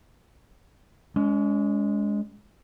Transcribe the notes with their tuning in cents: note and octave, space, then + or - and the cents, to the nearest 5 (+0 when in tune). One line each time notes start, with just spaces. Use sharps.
G#3 +0 C#4 +40